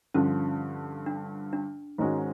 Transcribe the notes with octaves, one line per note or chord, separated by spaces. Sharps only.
G2 D3 F3 C#4
D4
D4
G#2 D#3 G#3 C#4 F#4